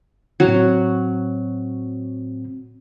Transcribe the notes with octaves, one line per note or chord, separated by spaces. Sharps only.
A2 F#3 C4